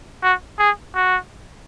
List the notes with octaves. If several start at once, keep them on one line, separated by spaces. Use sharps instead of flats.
F#4
G#4
F#4